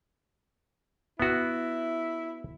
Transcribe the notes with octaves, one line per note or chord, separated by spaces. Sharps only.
B3 E4 F#4